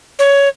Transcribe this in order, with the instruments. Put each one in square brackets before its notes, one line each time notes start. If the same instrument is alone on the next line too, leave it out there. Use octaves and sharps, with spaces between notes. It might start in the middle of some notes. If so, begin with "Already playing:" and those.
[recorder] C#5